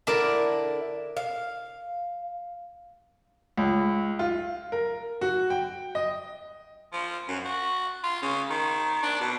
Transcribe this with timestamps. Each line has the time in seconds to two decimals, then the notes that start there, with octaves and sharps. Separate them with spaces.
0.07 D3 E4 A#4 D5 A5
1.17 F5
3.57 C#2
4.19 F4
4.72 A#4
5.21 F#4
5.50 G5
5.95 D#5
6.93 F3
7.28 F#2
7.45 F#4
8.03 F4
8.22 C#3
8.50 D#3
9.03 D4
9.21 B2